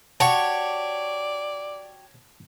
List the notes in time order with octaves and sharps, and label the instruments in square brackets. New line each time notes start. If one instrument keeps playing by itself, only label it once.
[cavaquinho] F#4 G4 [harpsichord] C#5 [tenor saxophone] D5 [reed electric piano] A5